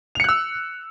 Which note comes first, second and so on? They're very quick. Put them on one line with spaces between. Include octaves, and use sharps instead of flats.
F7 C#7 F#6 E6